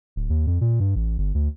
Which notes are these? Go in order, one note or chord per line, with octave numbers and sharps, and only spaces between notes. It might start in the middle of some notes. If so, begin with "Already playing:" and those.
D1
D#2
F2
A#2
G2
A1
G1
D2